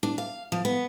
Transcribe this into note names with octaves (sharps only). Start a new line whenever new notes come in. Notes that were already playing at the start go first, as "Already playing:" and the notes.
D4
F5
F3
B3